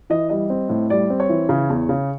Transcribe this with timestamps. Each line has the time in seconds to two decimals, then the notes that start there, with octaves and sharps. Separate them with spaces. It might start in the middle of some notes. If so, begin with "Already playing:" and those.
0.10 E3 D#5
0.30 G3 D#5
0.50 C4
0.69 A2
0.90 G3 D5
1.10 C4
1.20 C#5
1.29 E3
1.49 C#3
1.70 E2
1.89 C#3